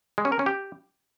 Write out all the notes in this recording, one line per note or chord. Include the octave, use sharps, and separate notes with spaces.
G#3
C#4
A#4
C#4
G4